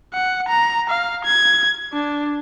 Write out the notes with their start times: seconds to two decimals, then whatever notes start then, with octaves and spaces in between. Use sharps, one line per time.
0.14 F#5
0.48 A#5
0.90 F5
1.25 G#6
1.94 D4